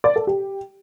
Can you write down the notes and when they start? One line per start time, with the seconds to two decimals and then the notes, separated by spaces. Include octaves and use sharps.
0.04 D5
0.16 A4
0.27 G4